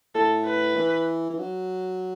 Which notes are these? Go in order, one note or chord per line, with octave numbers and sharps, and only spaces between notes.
A2 A4
B4
E3
E3
F#3